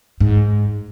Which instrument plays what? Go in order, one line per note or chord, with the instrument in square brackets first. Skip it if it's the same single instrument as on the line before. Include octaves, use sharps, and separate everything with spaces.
[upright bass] G#2